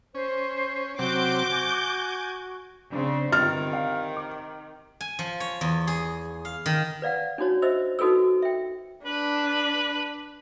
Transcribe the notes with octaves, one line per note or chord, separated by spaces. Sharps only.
C#4 C5
C3 F#3 C4 F#4 D6 G6
G#5
C#3 C4 D4
G1 C3 D#3 F6 A6
F5
D6
G#5
F3
C#5
E2
G#4
F5
D#3
B4 D5 F5 F#5
D4 D#4 F#4 C#5
C5 D#5 E5 E6
D#4 F#4 A4 B4 E6
E5 G5
D4 B4